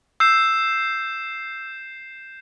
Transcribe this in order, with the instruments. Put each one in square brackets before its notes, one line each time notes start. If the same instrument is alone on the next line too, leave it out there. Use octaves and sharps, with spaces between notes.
[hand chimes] E6 [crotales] G6 C7 E7